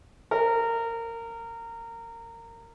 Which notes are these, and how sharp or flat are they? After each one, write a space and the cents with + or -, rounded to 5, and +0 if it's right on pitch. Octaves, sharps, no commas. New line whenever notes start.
A#4 -20